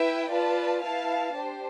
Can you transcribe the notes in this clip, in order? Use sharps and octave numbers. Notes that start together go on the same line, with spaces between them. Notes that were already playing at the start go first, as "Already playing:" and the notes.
Already playing: E4 B4 E5 G5
F4 B4 D5 A5
E4 B4 F5 A5
D4 G4 C5